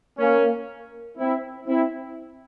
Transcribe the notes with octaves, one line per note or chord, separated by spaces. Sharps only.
A#3 C#4
C4 E4
C4 E4